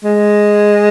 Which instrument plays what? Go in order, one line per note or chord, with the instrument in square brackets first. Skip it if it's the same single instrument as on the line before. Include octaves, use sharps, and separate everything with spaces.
[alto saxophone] G#3